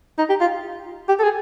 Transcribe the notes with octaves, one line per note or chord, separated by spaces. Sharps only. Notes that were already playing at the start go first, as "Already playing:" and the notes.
D#4
G4
F4
G4
A4
G#4